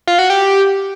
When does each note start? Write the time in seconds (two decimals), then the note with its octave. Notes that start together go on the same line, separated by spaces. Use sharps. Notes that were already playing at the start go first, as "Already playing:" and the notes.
0.07 F4
0.19 F#4
0.30 G4